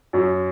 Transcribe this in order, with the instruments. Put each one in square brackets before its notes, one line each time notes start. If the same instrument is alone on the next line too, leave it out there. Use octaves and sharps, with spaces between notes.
[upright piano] F#2